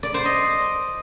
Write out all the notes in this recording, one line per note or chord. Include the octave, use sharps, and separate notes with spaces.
D5
C5
D#5